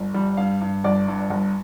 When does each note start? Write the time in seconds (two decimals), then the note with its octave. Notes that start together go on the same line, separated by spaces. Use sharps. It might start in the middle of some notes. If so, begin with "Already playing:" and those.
Already playing: G1
0.14 G3
0.37 G2 F5
0.61 G2
0.84 G1 D5
1.08 G2
1.30 G1